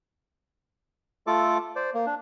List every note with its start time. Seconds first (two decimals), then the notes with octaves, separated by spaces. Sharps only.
1.27 A3 F4 A4 A5 D6
1.76 C5 D5
1.94 A#3
2.06 D4